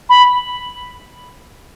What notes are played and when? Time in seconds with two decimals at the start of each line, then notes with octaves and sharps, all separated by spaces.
0.09 B5